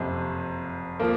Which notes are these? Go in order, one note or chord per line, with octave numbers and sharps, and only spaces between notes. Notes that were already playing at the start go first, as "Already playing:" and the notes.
Already playing: F#1 F2 C3
F3 A#3